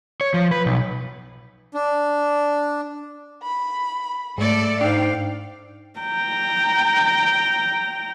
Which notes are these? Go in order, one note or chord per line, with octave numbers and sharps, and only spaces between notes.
C#5
F3
B4
B1
D4
B5
G#2 A3 A4 D5
G#2 D4 F5 G5
G5 A#5